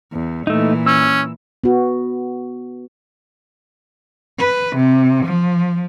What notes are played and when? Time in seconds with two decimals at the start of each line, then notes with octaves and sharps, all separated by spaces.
0.12 E2
0.47 A#2 E3 A3 D#4
0.86 C#4 E6
1.64 B3 F#4
4.39 B4
4.76 C3
5.26 F3